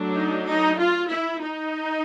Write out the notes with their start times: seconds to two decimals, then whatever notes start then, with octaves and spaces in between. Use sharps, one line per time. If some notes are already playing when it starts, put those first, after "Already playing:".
Already playing: F#3 A3 D4
0.15 D#4
0.47 D#4
0.79 F4
1.10 E4
1.42 D#4